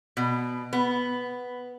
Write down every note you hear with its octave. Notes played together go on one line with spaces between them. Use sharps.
B2
B3